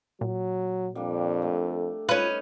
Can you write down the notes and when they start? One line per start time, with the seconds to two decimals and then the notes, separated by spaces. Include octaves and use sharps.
0.21 A#2 F#3
0.95 F2 G3 A#3 D4
1.42 A3
2.09 C#4 D#4 F4 B4